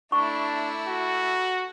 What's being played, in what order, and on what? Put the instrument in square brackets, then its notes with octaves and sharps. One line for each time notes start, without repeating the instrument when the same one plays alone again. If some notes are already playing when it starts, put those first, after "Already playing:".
[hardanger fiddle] A3 E4 [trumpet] D4 [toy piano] C#6
[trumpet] F#4